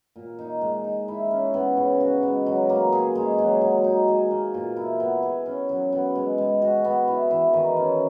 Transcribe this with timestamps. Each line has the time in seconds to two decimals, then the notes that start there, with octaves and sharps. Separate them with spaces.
0.16 A#2
0.39 D#4
0.61 G#3
0.84 D#4
1.08 E4
1.31 C#4
1.54 B3
1.77 C#3
2.00 F#4
2.23 G#3
2.46 F#3
2.69 A#3
2.92 G#4
3.15 G#3
3.38 F#3
3.61 F#3
3.84 D#4
4.08 G#4
4.31 A#3
4.54 A#2
4.76 E4
5.00 B3
5.23 G#4
5.46 C#4
5.69 F#3
5.92 B3
6.15 G#3
6.38 G#3
6.62 F#4
6.85 B3
7.08 E4
7.31 E3
7.53 D#3
7.77 C#4